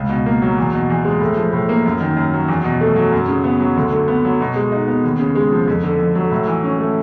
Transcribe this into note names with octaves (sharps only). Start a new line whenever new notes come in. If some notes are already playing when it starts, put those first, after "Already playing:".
Already playing: C#2
B2
A#3
F#3
E2
B2
E2
G#3
A2
F3
A2
A#3
F#2
D#3
F#2
F#3
E2
B2
A3
F#3
F#2
C#3
B3
F#3
D2
D3
B3
F#3
B2
G#3
D#4
B3
D#2
C#3
G#3
F3
F2
D3
F2
F#3
A2
E3
C#4
A3